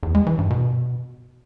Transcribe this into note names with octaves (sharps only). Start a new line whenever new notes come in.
E2
G#3
E3
G2
B2